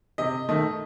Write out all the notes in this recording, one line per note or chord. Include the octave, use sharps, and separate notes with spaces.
C3 D#5
D#3 A3 D#5